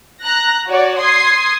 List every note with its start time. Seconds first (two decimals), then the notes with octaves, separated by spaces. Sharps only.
0.21 A#5 F#6 A#6
0.66 F#4 C#5 D5
0.98 C6 D#6 G#6 C7